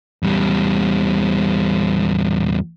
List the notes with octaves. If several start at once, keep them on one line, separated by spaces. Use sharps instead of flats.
E2 G3